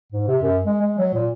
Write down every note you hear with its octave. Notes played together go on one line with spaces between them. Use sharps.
G#2
C3
F#2
G#3
G#3
F#3
A#2